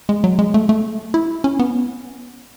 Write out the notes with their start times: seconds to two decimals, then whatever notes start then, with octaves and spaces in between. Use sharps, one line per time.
0.09 G#3
0.24 F#3
0.39 G#3
0.54 A3
0.69 A3
1.14 E4
1.44 C#4
1.59 B3